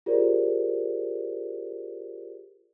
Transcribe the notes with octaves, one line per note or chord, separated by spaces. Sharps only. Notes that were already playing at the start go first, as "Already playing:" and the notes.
F4 G4 G#4 A#4 C5 D5